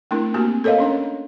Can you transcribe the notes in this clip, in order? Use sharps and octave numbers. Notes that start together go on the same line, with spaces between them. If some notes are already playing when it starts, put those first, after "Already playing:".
A3 C4 D4 E4 A#4
A#3 C4 F#4 G4
A4 A#4 C#5 D#5 F5
C#4 D4 C#5